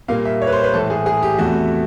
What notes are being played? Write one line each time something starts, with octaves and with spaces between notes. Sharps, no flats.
A#2 G3 A#3 F5
E5
C#5
B4
C5
B4
A2 E3 A3 A4
G#4
G#4
G4
E2 C3 E3 A3 F#4